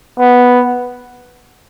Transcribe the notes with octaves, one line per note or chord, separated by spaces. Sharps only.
B3